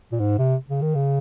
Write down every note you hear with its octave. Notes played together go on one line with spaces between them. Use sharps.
A#2
G#2
C3
C#3
D#3
C#3